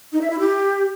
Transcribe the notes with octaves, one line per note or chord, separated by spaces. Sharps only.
D#4
E5
E4
G4